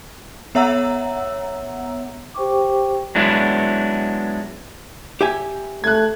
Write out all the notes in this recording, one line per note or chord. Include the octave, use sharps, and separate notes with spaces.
B3 C#5 E5 F#5 A#5 E6
G4 C5 G5 C#6 D6
F#3 G#3 B3 D4 E4
G4 E5 G#5
A3 F#6 G#6